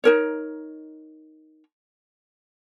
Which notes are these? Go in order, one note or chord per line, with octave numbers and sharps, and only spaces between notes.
D#4 A#4 C#5